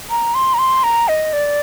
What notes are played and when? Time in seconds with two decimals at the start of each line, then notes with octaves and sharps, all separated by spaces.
0.10 A#5
0.35 C6
0.54 A#5
0.59 C6
0.84 A#5
1.08 D#5
1.33 D5